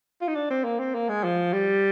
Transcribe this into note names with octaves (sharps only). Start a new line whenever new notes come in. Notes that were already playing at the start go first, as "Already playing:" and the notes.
F4
D#4
D4
C4
A#3
C4
A#3
G#3
F3
G3